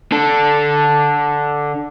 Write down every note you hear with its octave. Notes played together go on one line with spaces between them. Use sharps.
D3 A4